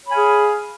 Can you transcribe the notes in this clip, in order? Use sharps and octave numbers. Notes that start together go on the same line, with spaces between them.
G#4 C#5 F5 G#5 B5